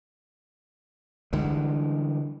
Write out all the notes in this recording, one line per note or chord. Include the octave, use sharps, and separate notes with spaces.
D3 E3 G3 G#3